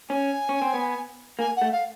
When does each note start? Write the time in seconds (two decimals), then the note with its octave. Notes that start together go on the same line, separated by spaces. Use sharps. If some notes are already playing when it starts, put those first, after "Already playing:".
0.09 C#4 G#5
0.49 C#4
0.62 C4
0.74 B3
1.39 A#3 G#5
1.56 F#5
1.62 A3
1.72 F5